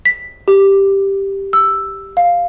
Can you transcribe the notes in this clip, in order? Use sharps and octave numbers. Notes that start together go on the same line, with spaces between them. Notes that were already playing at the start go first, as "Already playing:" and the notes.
B6
G4
E6
F5